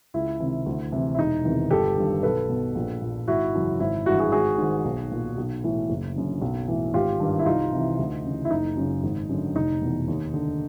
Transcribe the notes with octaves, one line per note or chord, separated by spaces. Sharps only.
C#2 E4
C3 D#3
D2
C3 E3
E4
E1 D#4
E2 C3 D#3
G1 G4 A4
G2 D#3
B1 A4 B4
B2
A#1
A#2
G#1 E4 F#4
F#2 C#3 E3
G#1 E4
G2 E3 E4 F#4
F#4 G#4
G#1 F#4 G#4
G#2 D#3
B1
A#2
B1
A2 E3
F#1
F#2 D3
B1
A2 E3
G#1 F4 G4
G2 D#3
E4
C2 D#4 F4
C3 E3
D2
C#3 E3
E4
F#1 D#4
F#2 C#3
G#1
F#2 D3
F1 D#4
E2 B2
D#2
D3